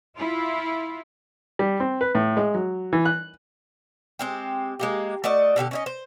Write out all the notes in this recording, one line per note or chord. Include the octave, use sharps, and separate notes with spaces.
E4 F4
G3
C4
B4
A2
G#3
F#3
E3
F#6
G#3 C4 G4
G#3 A#3 G4
A3 F#4 D5 D#5
B2 D3 F#4 G4
C#4 D#4 D#5
C5